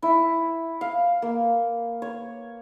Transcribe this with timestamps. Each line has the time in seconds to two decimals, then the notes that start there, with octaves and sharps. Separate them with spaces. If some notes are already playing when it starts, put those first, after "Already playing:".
0.02 E4
0.81 F5
1.22 A#3
2.02 C#5